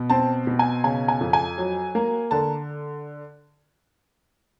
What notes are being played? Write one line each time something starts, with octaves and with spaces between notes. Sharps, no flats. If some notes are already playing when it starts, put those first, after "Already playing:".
Already playing: B2
C4 A5
B2
G#5
C#3 G#5
G#5
F2
G#5
F#3
A#3
D3 A5